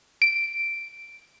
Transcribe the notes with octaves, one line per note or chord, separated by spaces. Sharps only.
D7